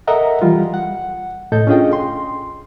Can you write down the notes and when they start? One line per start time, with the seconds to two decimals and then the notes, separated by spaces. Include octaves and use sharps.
0.07 A4 A#4 D#5 E5 F#5 A#5
0.42 E3 G3 F4
0.74 F#5
1.52 A2 A4 D#5 G6
1.67 C#4 D4 F4 G#4 D#5 G5
1.93 C6